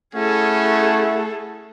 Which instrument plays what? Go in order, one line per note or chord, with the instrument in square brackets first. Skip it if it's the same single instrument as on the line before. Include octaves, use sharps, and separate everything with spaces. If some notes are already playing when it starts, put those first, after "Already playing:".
[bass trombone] A3 [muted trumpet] C#4 [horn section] E4 F#5 [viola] G#4 A4